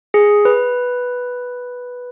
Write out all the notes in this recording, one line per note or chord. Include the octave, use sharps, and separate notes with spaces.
G#4
B4